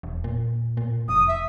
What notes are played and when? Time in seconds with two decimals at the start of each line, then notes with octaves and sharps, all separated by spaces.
0.03 E1
0.24 A#2
0.77 A#2
1.08 F1 D#6
1.28 E5